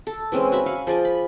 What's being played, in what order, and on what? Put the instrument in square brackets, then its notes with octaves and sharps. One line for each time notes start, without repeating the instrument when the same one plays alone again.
[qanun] A4
E3 G#3 C4 C#4
F#4 E5 B5
F5 G#5 C#6
F3 G#4 D5 G#5
B5